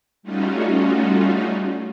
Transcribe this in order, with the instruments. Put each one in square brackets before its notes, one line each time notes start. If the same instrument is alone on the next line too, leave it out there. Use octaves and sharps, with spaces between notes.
[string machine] G3 A3 C#4 D#4 F4 F#4